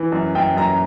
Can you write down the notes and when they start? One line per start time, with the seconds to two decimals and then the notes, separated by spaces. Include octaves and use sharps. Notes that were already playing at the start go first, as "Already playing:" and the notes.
Already playing: E3
0.12 F#2
0.35 F#2 G5
0.57 F#2 A#5